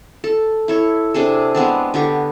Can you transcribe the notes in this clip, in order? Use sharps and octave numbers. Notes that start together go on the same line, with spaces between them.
A4
E4 A4 C#5
C3 D4 G#4 A4
G#3 B3 C4 D4
D3 B3 G4 C#6